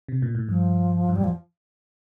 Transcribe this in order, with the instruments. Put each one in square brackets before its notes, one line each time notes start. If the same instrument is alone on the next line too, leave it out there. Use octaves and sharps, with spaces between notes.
[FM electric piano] C3
A#2
A2
[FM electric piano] G2 [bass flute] F3
[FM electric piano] G2
[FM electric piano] F2 A2 [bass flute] G3
[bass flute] F3